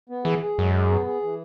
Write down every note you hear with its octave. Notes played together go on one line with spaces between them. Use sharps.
B3
E3 G#4
G#4
F#2 G#3
G#4
B3
G#4
E3